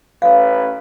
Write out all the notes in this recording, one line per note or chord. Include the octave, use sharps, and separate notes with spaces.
A1 C#4 B4 F5